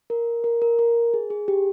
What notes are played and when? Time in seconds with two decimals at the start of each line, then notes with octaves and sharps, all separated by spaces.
0.10 A#4
0.44 A#4
0.62 A#4
0.79 A#4
1.14 G#4
1.30 G#4
1.48 G4